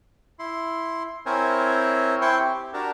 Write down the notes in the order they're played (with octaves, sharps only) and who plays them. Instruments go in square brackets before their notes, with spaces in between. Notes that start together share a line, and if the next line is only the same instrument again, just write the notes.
[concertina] E4 C6
C4 E4 A#4 C5 C#5 G#5
C4 E4 C5 G5 C6 C#6
G4
D4 F#4 G4 A#4 A5